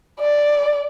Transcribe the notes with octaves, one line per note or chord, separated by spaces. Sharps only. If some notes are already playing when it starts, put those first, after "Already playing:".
D5